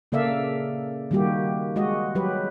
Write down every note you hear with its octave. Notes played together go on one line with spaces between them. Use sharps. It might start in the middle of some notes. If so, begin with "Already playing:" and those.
C#3 A#3 A4 D5 E5 F5
D#3 G3 A#3 F#4 G4
G#3 F#4 D#5
F#3 G4 B4